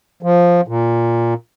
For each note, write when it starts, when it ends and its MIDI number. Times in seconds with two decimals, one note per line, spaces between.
0.23 0.61 53
0.68 1.34 46